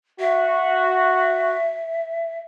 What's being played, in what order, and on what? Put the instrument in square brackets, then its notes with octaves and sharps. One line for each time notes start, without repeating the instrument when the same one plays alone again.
[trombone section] F#4 [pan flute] E5